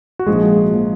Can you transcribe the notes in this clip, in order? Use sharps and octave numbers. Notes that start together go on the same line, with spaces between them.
F#4
A#1 G#2 F3 G#3 A#3 G#4
F3 A#3